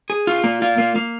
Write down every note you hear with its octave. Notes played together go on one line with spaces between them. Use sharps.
G#4
F4
A#3
F4
A#3
A#3